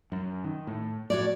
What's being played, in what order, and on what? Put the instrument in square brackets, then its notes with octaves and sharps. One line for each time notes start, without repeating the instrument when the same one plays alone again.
[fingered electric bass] F#2
D#3
A2
[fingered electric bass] A2 [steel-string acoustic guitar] F#4 C#5 D5